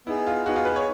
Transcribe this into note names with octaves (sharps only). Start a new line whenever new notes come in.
B3 D#4 E4 G#4
F4
B3 D#4 F#4 G#4
F4
B4
C#5